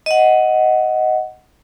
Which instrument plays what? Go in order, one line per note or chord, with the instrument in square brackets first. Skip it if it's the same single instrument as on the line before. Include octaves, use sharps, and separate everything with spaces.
[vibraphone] D#5 F#5